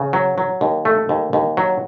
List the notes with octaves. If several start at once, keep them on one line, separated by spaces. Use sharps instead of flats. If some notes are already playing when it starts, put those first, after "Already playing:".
Already playing: C#3
F#3
F#3
D#2
A3
D#2
D#2
F#3